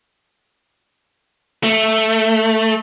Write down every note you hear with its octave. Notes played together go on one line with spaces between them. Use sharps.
A3